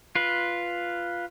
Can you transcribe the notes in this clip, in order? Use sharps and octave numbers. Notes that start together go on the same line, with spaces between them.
F4 B4